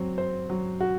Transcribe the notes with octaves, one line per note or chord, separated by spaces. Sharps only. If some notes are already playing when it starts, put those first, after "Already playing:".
Already playing: F#3 C4
C5
F#3
F#4